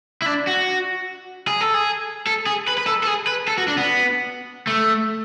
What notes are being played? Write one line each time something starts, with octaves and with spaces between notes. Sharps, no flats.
E4
D4
F#4
G#4
A4
G#4
A4
G#4
B4
B4
A4
A4
G#4
B4
A4
F#4
D4
B3
A3